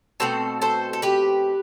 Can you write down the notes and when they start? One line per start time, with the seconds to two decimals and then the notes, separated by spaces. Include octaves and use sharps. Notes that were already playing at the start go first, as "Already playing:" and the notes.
0.20 B2 A3 C4 A4 C5
0.62 A4 C5
0.93 A4
1.02 G4 B4